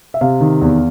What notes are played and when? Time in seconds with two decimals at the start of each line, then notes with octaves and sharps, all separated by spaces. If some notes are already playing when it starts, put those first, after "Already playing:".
0.14 E5
0.21 C3 F5
0.41 D#3
0.61 E2